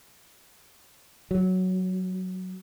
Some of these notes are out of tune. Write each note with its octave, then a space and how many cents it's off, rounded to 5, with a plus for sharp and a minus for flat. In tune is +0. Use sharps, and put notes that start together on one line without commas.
F#3 +5